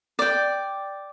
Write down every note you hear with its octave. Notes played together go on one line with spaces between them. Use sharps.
D5 G5